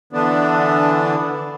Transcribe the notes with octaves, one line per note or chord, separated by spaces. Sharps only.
D3 E3 B3 D4